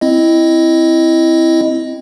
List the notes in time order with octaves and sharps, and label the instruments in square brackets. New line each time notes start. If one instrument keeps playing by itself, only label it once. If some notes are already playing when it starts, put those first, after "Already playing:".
[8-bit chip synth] C4 E4 D#5